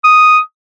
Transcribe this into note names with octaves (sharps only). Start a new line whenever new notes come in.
D#6